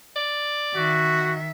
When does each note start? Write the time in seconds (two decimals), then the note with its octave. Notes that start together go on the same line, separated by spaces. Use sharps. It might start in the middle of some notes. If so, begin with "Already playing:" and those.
0.16 D5
0.75 D#3 F#4 E5